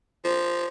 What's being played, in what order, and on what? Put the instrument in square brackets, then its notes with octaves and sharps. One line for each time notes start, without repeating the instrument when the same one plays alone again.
[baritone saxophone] F3